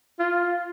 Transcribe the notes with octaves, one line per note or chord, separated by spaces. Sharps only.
F4